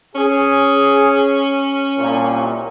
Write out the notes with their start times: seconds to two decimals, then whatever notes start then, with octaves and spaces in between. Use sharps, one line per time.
0.15 C#4 G#4
1.97 C2 A#2